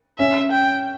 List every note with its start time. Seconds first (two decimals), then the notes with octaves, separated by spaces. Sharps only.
0.19 C#4 E5
0.51 G5